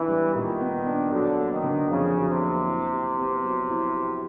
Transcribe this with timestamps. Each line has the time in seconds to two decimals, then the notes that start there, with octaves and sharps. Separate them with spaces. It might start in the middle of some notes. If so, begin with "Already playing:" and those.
Already playing: E3 B3 D4
0.08 G3
0.34 A#2 D#3
0.60 B3
0.86 D4
1.12 D3 F#3
1.37 A#3
1.50 D#3
1.63 D3
1.89 F2 C#3
2.15 F#3
2.28 C3
2.40 A#3
2.66 E4
2.92 G4
3.18 B3
3.44 F#3
3.69 E4
3.95 G4